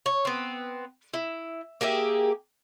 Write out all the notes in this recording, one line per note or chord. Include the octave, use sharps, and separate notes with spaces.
C#5
B3 C4
E4
A#3 G4 G#4 E5